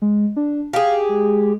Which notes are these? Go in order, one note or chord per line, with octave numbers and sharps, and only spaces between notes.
G#3
D4
G4 G#4 F5
G#3